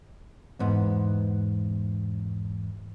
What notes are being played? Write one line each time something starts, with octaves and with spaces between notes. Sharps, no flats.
E2 G#2 B3